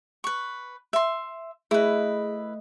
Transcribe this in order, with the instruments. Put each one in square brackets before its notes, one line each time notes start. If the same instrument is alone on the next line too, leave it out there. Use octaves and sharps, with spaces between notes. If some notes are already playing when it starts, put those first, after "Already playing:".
[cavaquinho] B4 C#6
E5 C6
[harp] A3 D#5 [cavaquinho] E4 B4 [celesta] G#4